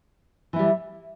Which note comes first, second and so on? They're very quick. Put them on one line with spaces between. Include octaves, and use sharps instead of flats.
E3 E4 G3